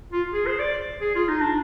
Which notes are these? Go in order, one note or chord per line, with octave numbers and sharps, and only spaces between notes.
F4
G#4
C5
D5
G#4
F4
D#4
D4